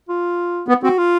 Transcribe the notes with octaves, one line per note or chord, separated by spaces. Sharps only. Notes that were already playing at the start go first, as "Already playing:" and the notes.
F4
B3
C4 F#4
F4